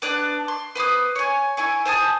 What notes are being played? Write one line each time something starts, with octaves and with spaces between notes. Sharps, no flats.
B3 D4 D5 F#6
C6
B4 C5 D6 D#6
C#5 G#5
E4 G#5 C#6
C5 G#5 A5 D#6